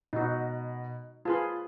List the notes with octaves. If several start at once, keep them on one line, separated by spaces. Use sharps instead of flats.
B2 D#4 F#4
F4 G#4 B4 A5 C6